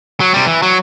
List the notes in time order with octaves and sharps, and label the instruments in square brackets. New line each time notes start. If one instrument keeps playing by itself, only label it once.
[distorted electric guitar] F#3
C3 G3
E3
F#3